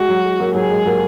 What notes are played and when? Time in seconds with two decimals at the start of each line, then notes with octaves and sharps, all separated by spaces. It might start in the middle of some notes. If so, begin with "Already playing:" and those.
Already playing: G#3 F#4
0.09 F#3
0.24 G#3
0.40 F#3 A#3
0.55 F#3 G#4
0.70 G#3
0.86 F#3 A#3